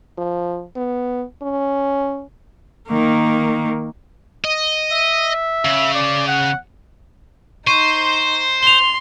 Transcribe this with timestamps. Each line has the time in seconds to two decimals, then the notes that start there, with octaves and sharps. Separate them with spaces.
0.18 F3
0.76 B3
1.42 C#4
2.88 D#3 A#3
4.45 D#5
4.92 E5
5.65 C#3
5.94 D5
6.27 F#5
7.67 D#4 C5 C#6 D#7
8.63 C6 F7 G7